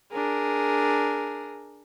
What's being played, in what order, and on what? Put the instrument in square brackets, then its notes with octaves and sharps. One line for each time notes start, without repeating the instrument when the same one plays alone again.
[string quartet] D4 G#4 A#4